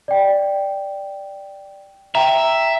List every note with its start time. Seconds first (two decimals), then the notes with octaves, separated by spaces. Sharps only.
0.08 D5 G5
2.15 E5 G5 A#5